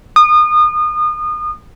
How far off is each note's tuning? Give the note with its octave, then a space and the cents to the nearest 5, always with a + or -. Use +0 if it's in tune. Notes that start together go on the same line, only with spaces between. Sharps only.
D#6 -30